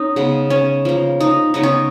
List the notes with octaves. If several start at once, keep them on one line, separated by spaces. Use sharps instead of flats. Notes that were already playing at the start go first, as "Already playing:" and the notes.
Already playing: C#4 D#4
C#3 G#3 B3
C#4
F3 A#3
D#4
C#3 G#3 B3 D#4
C#4